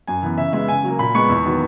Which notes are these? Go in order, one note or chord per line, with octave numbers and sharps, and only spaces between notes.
F#2 G#5
E3 B3
C#3 E5
G#3 B3 E5
C#3 G#5
F#3 A#3
A#2 B5
G#3 B3 C#6
E2
D#3 F#3 B3